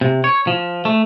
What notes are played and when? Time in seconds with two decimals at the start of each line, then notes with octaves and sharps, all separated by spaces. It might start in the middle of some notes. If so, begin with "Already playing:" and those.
0.01 C3
0.24 C#5
0.47 F3
0.85 A3